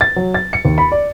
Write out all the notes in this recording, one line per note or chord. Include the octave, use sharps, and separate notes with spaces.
A6
F#3
A6
C#7
D#2
B5
D5